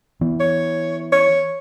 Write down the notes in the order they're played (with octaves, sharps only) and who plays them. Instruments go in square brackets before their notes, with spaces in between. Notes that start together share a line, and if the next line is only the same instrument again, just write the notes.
[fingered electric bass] E3 B3
[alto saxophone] C#5
C#5